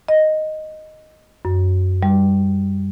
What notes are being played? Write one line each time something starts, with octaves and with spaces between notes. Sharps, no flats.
D#5
F#2
G3